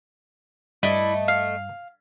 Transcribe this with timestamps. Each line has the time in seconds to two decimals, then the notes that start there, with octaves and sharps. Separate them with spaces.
0.83 G2 A3 E4 D5 D#5
1.28 F5